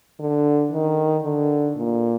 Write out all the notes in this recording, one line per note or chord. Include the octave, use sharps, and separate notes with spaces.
D3
D#3
D3
A#2